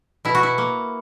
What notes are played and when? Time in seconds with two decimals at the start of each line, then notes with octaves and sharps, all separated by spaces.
0.25 B2 E4
0.35 F#4
0.43 E4
0.58 A#3